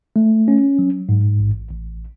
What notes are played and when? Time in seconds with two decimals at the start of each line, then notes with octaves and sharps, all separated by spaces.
0.16 A3
0.48 C#4
0.79 F#3
1.09 G#2
1.40 A1
1.71 A1